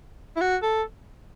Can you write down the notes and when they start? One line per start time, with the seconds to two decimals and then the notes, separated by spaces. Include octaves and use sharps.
0.36 E4
0.41 F#4
0.62 A4